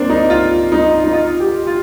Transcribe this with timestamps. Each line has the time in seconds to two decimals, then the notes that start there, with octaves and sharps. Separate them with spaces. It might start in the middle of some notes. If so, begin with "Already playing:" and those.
Already playing: A#3 C4 D4
0.10 D#4
0.30 F4
0.72 D#4
1.04 D#4
1.13 F4
1.40 G4
1.67 F4